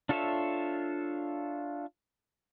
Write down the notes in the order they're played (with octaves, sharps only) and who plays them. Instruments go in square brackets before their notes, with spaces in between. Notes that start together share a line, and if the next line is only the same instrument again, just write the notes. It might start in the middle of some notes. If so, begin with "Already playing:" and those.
[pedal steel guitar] D4 F4 A4 C#5 E5